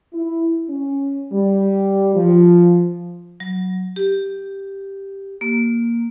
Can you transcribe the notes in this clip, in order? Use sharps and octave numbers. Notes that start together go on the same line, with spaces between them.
E4
C#4
G3
F3
F#3
G4
A#3